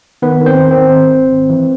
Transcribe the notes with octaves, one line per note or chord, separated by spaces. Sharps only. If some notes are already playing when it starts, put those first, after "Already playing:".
D#3 B3 B4
D#3
C4 C5
D#2
C4 C5
D#3
G#1
G#1
G#1
E3